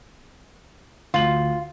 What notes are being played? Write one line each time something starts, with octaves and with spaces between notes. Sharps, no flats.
D2 F4 F#7